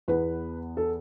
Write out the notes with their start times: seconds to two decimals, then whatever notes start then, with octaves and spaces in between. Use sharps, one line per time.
0.08 E2 E3 B3 B4
0.77 A4